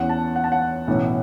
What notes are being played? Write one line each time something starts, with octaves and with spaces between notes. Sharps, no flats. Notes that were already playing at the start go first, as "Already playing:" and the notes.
Already playing: E2 E3 C#4 F#5
A5
F#5
A5
F#5
B1 A2 E3 C#4